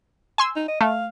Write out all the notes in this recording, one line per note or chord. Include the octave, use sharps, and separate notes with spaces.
G#5 C6 E6
D#4
D#5
A3 F5